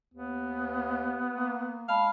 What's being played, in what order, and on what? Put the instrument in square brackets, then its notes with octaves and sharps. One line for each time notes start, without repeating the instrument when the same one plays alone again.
[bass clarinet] D#2 [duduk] B3
[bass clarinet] A#3
[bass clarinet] G#3 [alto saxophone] F5 [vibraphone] A5 B5